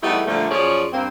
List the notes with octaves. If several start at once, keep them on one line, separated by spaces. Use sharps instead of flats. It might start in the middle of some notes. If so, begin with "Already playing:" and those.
E2 G3 A3 B3 D#4 E4
A#2 D3 F3 G3 A3
F#2 F3 C#4 G#4 C#5 D5
G2 A#3 C4